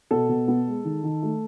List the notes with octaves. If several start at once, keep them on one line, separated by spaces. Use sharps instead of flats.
B2 A4
B2
B3
G#3
D#3
D#3
A3